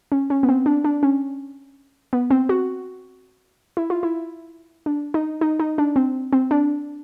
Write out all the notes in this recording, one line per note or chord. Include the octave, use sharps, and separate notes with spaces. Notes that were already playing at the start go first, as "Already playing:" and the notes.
C#4
C#4
B3
C4
D4
D4
C#4
B3
C4
F#4
E4
F4
E4
D4
D#4
D#4
D#4
D4
C4
C4
D4